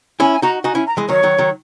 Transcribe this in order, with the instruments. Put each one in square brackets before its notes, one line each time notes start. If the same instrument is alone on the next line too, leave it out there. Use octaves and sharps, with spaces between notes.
[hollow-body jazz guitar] C#4 E4 [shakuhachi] G#5
[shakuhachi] G#5
[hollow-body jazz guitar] D#4 F#4 [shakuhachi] A#5
[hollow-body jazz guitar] D#4 F#4 [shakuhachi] G#5
[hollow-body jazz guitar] C#4 E4
[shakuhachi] A#5
[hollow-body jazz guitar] E3 G#3
[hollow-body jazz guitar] D#3 F#3 [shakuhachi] C#5
[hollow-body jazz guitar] D#3 F#3
D#3 F#3